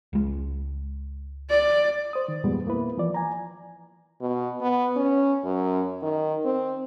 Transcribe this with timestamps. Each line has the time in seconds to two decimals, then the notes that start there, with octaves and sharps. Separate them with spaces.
0.13 C#2 G#3
1.49 D5
2.13 C5 D#6
2.28 D#3
2.44 E2 G2 A#2 G3 G#3 B3
2.67 A#3 B3 E4 B4
2.97 E3 F3 D5
3.14 G#5 A#5
4.21 B2
4.61 B3
4.96 C#4
5.44 F#2
6.03 D#3
6.45 C4